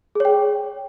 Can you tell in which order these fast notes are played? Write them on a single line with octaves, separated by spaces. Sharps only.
G#4 C#5 G5